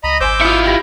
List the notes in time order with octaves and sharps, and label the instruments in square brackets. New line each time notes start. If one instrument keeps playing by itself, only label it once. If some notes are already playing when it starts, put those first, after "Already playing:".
[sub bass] C#2 [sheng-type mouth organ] D#5 A#5 B5
[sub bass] G#1 [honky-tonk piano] C5 G#5 [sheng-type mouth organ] D6 E6 G6
[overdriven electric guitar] E4 F4 [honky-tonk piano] D#6 F6 C#7
[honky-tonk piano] G4 B5 A#6